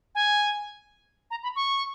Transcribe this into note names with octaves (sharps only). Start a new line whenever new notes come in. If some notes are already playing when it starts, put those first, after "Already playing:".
G#5
A#5
B5
C#6